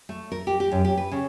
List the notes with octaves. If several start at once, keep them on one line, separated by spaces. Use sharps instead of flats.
A3
A#4
G4
G4
F#2
G4
B4
C#3